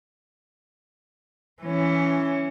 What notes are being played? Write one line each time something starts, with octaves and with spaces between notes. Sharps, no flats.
E3 C#4